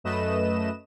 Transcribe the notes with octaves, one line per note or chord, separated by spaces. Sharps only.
F#2 A3 B4 D#5 E7